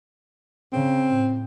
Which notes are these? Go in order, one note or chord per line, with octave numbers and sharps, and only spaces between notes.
C#3 C4
A2